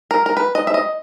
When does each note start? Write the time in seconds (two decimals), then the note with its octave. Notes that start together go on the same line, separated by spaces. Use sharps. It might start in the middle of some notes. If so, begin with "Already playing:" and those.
0.11 A#4
0.26 A#4
0.37 B4
0.55 D#5
0.67 E5
0.74 D#5